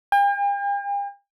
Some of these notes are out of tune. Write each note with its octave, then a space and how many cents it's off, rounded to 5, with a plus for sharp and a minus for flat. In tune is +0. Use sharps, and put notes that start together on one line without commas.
G5 +45